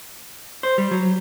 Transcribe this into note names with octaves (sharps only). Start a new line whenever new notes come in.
C5
G3
F#3